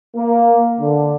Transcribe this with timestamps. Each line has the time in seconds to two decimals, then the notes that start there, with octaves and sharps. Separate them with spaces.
0.16 A#3
0.79 D3